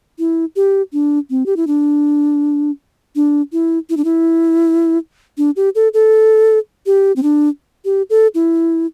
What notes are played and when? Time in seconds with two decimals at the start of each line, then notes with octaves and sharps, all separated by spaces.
0.19 E4
0.56 G4
0.93 D4
1.30 C4
1.46 G4
1.57 E4
1.67 D4
3.16 D4
3.53 E4
3.90 E4
3.97 D4
4.05 E4
5.38 D4
5.56 G4
5.75 A4
5.94 A4
6.86 G4
7.16 C4
7.23 D4
7.85 G4
8.10 A4
8.35 E4